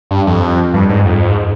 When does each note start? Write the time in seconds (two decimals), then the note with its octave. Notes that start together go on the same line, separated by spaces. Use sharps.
0.11 G2
0.27 F2
0.74 G2
0.89 G#2
1.05 F2
1.29 G#2